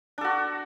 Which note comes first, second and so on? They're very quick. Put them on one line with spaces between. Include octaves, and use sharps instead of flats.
D4 A4 F#4